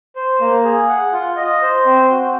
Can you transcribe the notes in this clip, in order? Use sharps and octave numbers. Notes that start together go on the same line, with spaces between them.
C5
A#3
G#4
F#5
F4
D#5
C5
C4
F#4